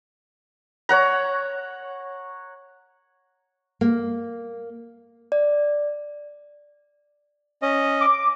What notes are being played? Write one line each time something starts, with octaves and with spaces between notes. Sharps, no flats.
C#5 F#5 A#5
A#3
D5
C#4 D#5
D6